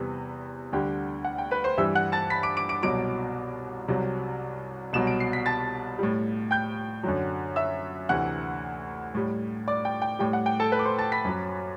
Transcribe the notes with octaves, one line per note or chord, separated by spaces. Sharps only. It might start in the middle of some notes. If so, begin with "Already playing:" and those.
Already playing: E2 C3 G3 B4
D2 D3 G3 G5
F#5
G5
B4 B5
C5 C6
G2 E3 G3 E5 E6
F#5 F#6
A5 A6
B5 B6
D6 D7
D6 D7
D6 D7
C2 B2 F#3 D6 D7
C2 C3 F#3
C2 B2 F#3 E7
D7
C7
B6
A5 A6
A2 G3
G5 G6
F#2 D3 F#3
E5 E6
D2 C3 E3 F#5 F#6
A2 G3
D5 D6
G5
G5
A2 G3 G5
F#5
G5
A4 A5
B4 B5
D6
C5 C6
A5 A6
B5 B6
F#2 F#3